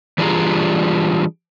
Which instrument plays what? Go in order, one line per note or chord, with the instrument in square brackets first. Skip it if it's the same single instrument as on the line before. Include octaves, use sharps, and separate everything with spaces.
[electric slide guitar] E3 G3 D4 F4 G#4 A#5